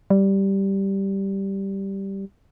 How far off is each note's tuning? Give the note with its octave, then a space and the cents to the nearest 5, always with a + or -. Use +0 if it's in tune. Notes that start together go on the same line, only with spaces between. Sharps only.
G3 -5